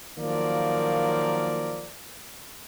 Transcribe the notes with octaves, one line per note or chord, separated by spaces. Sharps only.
D#3 F3 F#3 A#3 A#4 D5